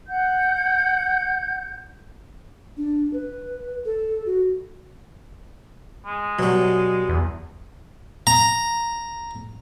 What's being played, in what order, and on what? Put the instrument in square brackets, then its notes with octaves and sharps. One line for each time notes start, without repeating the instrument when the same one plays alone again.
[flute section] F#5 G6
[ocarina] D4
B4
A4
F#4
[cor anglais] G#3
[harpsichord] B2 G3 [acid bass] F#3
[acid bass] E2
[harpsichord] A#5